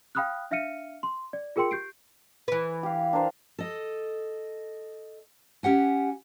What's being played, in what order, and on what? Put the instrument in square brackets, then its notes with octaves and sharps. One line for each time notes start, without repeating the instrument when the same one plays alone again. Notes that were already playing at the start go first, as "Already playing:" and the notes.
[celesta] F5 G5 B5 D#6 F6 F#6
D4 E5 F5 F6 C#7 D#7
C6
D5
F4 G#4 A#4 G5 C6 C#7
G4 G6 C7 D7
[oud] E3 B4
[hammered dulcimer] G4 F5
D4 A#4 C5
[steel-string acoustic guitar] A4 D#5
C#4 G4 F#5 G#5